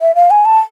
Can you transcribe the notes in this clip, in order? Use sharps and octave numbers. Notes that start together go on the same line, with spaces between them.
E5
F5
G#5
A5